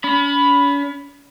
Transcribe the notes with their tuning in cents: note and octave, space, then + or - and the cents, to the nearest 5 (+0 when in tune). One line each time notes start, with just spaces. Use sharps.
C#4 +45 B5 +0